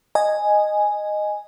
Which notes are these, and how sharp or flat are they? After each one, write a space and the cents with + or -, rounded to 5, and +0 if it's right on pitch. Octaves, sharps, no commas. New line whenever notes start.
D#5 -10 G#5 +0